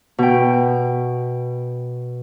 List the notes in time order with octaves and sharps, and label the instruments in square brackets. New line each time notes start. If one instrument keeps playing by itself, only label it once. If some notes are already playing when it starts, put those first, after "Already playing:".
[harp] B2 G5